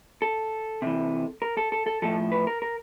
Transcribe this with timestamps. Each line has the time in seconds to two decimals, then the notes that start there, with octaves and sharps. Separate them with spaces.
0.22 A4
0.82 C3 E3
1.42 A#4
1.57 A4
1.72 A4
1.87 A4
2.02 A2 F3 A4
2.32 B4
2.47 A#4
2.62 A#4